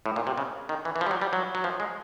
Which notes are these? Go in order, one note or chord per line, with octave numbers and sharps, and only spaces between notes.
A2
A#2
C3
C#3
D#3
E3
E3
F3
G3
F#3
G3
F#3
F#3
F3
G#3